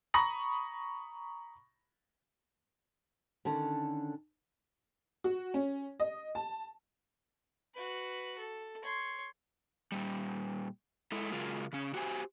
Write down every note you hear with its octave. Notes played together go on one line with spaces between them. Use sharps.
A#5 B5 C#6 D#6 A#6 F#7
D3 D#3 C#4 D4 A4 A5
F#4
C#4
D#5
A5
F#4 B4
A4
C#5 C6
A#2 G3
G#3 E4 A4
C#3 F#3 G#3 F4 G#4 A#4
C#3 C#4
F#4 G4 C5 F#5 G#5